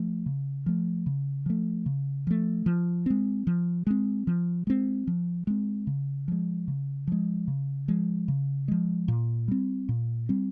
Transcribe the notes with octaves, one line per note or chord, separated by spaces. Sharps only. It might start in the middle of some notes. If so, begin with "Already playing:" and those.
Already playing: F3 A3
C#3
F3 A3
C#3
F3 A3
C#3
F3 A3
F3
G#3 C4
F3
G#3 C4
F3
G#3 C4
F3
G#3 C4
C#3
F3 G#3
C#3
F3 G#3
C#3
F3 G#3
C#3
F3 G#3
A#2
G3 C4
A#2
G3 C4